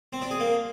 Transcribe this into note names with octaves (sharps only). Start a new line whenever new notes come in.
C4
D4
G#4
A#3